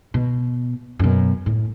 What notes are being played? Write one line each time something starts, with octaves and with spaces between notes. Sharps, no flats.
B2
F#2 B2
A2